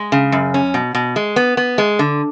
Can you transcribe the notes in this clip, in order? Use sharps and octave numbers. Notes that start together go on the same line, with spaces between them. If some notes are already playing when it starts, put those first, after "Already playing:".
Already playing: G#3
C#3
F#2
C#4
B2
B2
G#3
B3
B3
G#3
D3